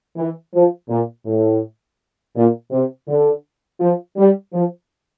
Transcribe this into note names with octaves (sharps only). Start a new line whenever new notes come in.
E3
F3
A#2
A2
A#2
C3
D3
F3
G3
F3